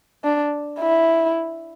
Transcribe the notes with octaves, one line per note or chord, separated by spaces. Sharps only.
D4
E4